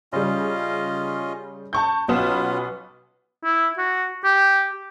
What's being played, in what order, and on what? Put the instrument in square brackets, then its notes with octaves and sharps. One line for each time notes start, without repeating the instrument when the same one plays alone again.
[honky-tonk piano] C#3 G3 [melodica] C#4 F4 D#5
[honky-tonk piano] A5 C#6 G6
[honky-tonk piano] B1 B3 E7 [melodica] C#4 F4
[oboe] E4
F#4
G4